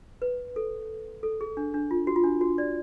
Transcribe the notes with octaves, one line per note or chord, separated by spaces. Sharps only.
B4
A4
A4
G#4
D4
D4
F4
F#4
F4
D4
F#4
D5